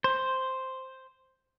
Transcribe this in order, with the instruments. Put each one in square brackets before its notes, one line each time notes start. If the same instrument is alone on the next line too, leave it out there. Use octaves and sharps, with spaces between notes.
[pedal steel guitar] C5